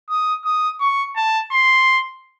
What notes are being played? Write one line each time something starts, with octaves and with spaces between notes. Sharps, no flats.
D#6
D#6
C#6
A5
C6